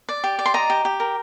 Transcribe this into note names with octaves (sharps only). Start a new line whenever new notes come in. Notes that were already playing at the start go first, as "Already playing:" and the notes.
D5
G4
D5
C6
D#5 A#5
G4
G4
A#4